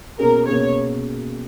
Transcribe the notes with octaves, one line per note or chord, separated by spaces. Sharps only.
B2 A#3 C#4 G#4 A#4
B2 A#3 C#4 G#4 C#5